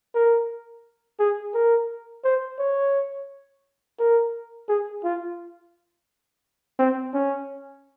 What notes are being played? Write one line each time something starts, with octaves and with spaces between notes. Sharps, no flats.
A#4
G#4
A#4
C5
C#5
A#4
G#4
F4
C4
C#4